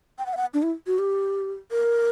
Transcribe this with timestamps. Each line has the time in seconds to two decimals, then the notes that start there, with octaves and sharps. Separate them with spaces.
0.19 G5
0.26 F#5
0.34 E5
0.37 F#5
0.54 D4
0.62 E4
0.87 F#4
0.99 G4
1.71 A#4